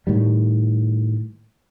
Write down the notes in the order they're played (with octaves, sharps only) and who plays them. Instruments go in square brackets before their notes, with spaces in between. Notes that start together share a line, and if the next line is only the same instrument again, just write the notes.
[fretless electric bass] A2 D#3 G3